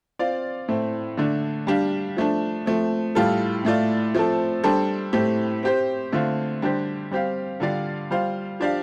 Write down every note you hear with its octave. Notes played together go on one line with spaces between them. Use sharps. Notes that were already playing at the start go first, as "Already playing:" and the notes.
C4 F4 D5 F5
A2 A3 C4
D3 A3 D4
G3 D4 G4 F5
F3 A3 D4
F3 A3 C4
A2 G3 F4 A4
A2 A3 F4 D5
F3 A3 C4 A4
G3 D4 A4 C5
A2 A3 C4 G4
C4 G4 C5
D3 A3 C4 F4
D3 G3 D4 G4 C5
G3 C4 G4 F5
D3 G3 F4 D5 F5
G3 F4 C5 F5
F3 D4 G4 D5 F5